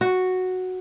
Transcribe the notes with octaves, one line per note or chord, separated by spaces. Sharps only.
F#4